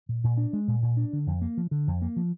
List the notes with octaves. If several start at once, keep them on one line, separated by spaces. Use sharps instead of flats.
A#2
A#2
D4
G#3
A#2
A#2
D4
D3
F2
A#3
F3
D3
F2
A#3
F3